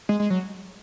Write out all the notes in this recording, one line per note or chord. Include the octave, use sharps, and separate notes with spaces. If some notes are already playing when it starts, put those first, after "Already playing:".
G#3
G#3
F#3